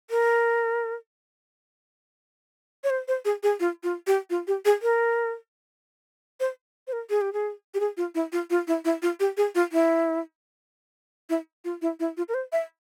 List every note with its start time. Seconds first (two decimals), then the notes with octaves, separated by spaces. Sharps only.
0.11 A#4
2.84 C#5
2.90 C5
3.08 C5
3.25 G#4
3.43 G#4
3.60 F4
3.83 F4
4.07 G4
4.30 F4
4.48 G4
4.65 G#4
4.82 A#4
6.40 C5
6.87 C5
6.93 A#4
7.10 G#4
7.21 G4
7.33 G#4
7.74 G4
7.80 G#4
7.97 F4
8.15 E4
8.32 F4
8.50 F4
8.67 E4
8.85 E4
9.02 F4
9.20 G4
9.37 G#4
9.55 F4
9.72 E4
11.30 E4
11.65 F4
11.82 E4
12.00 E4
12.17 F4
12.29 A#4
12.34 C5
12.52 E5